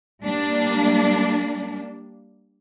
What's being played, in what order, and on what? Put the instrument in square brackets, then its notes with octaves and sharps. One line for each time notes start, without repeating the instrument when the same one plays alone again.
[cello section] G3 A#3 D4